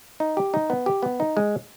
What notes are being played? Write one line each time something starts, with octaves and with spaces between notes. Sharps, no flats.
D#4
G4
D#4
B3
G4
B3
D#4
G#3